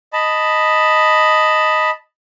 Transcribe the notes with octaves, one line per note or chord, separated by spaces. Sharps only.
D#5 A5 B5